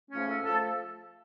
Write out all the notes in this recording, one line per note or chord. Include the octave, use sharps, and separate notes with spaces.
G#2 F3 A3 C#4
A4
F3 A3 A4